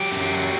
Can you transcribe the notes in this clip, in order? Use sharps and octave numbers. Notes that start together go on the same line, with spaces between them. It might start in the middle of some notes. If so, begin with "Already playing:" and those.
Already playing: F#3 G4
F#2
F#3